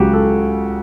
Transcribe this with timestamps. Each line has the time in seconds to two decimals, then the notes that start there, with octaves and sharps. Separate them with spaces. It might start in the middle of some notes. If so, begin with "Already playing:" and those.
Already playing: C#2 C#3 F#3 F#4 G4
0.13 A4